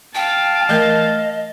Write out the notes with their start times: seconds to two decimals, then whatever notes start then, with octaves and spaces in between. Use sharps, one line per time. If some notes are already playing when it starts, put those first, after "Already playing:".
0.15 F5 G5 A5
0.69 E3 A3 A#4 D#5